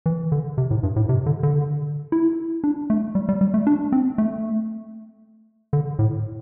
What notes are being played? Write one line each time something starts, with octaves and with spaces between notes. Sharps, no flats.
E3
D3
C3
A2
G2
A2
C3
D3
D3
E4
D4
A3
G3
G3
G3
A3
D4
C4
A3
D3
A2